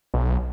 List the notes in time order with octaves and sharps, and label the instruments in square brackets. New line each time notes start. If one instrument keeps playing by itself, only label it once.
[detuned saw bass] B1